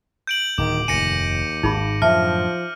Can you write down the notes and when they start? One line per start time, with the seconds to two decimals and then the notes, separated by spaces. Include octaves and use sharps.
0.27 G6 D7 F#7
0.58 D1 D#3 D6
0.88 F1 D#2 A2 G#5 A#6 C#7 D#7
1.63 G#1 D#4 G#4 B5
2.02 F#2 A2 D3 F3 E5 A5 F6